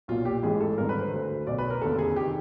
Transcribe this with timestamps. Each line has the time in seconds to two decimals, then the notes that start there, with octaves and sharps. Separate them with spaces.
0.08 B1 A#2 F4
0.25 G4
0.43 A1 G#2 E3 G#4
0.60 A4
0.78 G#1 G2 D3 A#4
0.89 B4
1.01 C5
1.12 D2 D3
1.47 B1 D5
1.50 B2
1.58 B4
1.70 A#4
1.81 F1 D#2 D3 A4
1.99 G#4
2.16 D#3 G4